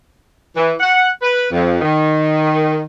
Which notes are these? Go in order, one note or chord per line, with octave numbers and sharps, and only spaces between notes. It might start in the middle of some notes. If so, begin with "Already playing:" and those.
E3
F#5
B4
F2
D#3